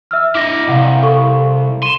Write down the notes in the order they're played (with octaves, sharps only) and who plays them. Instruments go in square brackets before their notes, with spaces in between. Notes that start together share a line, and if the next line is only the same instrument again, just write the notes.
[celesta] E5 E6 F6
[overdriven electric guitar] E4 D#5 [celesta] D6 A#6
[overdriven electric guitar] C2 [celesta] F5 F#5
[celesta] A4 F5 C#6
[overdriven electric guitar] C6 [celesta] D#7 E7